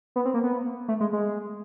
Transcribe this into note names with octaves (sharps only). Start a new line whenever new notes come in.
B3
C4
A#3
B3
A3
G#3
G#3